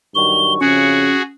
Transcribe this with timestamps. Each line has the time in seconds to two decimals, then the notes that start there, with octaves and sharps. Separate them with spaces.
0.15 G2 D#3 F#3 C#6 G7
0.61 F2 C#3 C#4 F#4 G#4 C#7